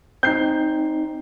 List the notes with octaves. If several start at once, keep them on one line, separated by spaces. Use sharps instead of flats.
C4 D#4 G6 C7